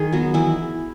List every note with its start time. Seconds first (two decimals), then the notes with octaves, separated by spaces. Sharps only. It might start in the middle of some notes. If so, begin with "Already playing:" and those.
Already playing: D#3 G#4
0.12 F#3 B3
0.34 E3 E4